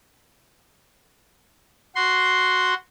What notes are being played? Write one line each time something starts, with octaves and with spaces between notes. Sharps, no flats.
F#4 C6